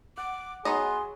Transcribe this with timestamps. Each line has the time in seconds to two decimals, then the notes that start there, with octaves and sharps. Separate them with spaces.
0.17 F#5 D6
0.65 F#3 B3 D#4 G#4 D#5 C6